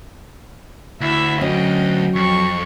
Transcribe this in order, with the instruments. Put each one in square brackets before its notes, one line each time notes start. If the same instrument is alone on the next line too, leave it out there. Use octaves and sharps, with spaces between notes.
[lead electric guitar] D2 [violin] E4 E5
[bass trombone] F#3 [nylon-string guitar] C#4 [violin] D#5 G5
[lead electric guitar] F2 [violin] C#6